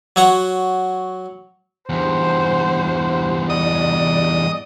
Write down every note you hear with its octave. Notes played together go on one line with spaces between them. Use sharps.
F#3 C#5 F#5
E2 G2 C5
D5 D#5 D#6